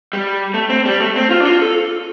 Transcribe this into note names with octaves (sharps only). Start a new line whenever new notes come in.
G3
A3
C4
G3
A3
C4
F4
D4
F4
A4